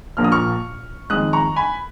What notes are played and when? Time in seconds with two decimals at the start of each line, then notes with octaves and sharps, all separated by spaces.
0.17 A#1 A#2 F3 A#3 F6
0.24 D#6
0.32 C#6 F6
1.10 F2 D#3 G#3 D#6 F#6
1.33 A#5 C#6
1.56 G#5 B5